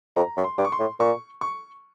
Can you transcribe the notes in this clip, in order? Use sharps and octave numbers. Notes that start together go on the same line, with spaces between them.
F2 A#5
F#2
C6
G2 D6
C#6
C6
A2
A#2 C#6
C#6